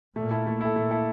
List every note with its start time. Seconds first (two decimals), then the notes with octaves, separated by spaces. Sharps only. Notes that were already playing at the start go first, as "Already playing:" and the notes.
0.16 A#2 A3 A#3
0.31 E4 A4
0.47 A3
0.61 E4 A4
0.76 A#2 A3 A#3
0.91 E4 A4